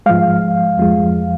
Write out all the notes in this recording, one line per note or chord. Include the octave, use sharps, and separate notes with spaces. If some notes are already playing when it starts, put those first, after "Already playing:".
G#2 F3 G#3 F5
F2 F3 G#3